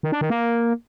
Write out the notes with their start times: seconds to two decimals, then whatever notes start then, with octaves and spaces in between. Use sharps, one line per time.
0.03 D#3
0.12 D4
0.21 D#3
0.30 A#3